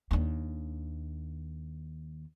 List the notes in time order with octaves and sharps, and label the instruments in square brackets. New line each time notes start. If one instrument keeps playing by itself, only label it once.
[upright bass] D#2 D4